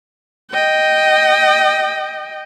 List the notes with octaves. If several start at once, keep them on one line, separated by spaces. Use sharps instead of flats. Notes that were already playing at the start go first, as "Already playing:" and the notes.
D#5 G5